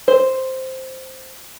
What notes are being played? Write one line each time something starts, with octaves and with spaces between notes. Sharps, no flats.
C5